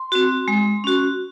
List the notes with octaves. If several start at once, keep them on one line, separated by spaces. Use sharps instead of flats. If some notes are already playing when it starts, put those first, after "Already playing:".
Already playing: C6
C4 F#4
G#3
C#4 F#4